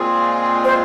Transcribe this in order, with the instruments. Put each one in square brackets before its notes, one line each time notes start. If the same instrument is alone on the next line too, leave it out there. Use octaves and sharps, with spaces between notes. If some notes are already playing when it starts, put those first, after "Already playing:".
Already playing: [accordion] A#2 G#3 C4 F4 G#4
[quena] C5